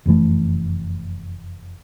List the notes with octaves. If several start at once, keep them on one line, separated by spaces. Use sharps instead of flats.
F1 F#2 E3 A3